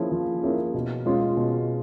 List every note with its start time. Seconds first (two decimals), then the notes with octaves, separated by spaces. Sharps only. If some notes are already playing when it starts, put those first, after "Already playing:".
Already playing: F3 A#3 C#4 E4 G#4
0.12 F3
0.43 A#3 C#4 E4 G#4
0.74 B2
1.06 G#3 C#4 F4
1.37 B2